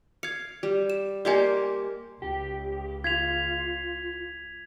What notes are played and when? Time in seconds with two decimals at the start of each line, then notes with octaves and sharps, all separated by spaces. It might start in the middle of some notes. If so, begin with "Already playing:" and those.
0.23 F5 G#6 C#7
0.63 G3
0.90 E7
1.25 A#3 G4 C5 D5 D#5 G#5
2.22 C#2 G4
3.04 F4 G#6 B6 F7